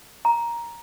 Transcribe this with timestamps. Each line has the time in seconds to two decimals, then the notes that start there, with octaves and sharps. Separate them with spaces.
0.25 A#5